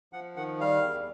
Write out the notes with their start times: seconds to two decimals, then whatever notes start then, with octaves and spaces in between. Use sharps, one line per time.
0.13 F3 F#5
0.36 D#3 F#5
0.60 G3 F5
0.83 E2